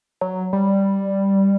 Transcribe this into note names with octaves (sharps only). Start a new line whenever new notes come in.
F#3
G3